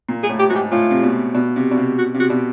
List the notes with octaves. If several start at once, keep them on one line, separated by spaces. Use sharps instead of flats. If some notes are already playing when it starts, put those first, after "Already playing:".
A#2
G#4
A2
G4
G#2 F#4
G4
A2 F4
C3
B2
B2
C3
B2
C3
F#4
C3
F#4
B2